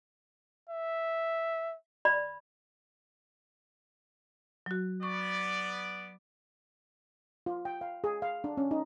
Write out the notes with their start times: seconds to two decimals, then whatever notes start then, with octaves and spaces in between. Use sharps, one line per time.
0.70 E5
2.05 D5 B5
4.66 F#3 F#4
5.03 B3 D5 C#6
7.46 F4
7.65 G5
7.81 F5
8.04 G#4
8.22 F5
8.44 D4
8.57 C#4
8.71 D#4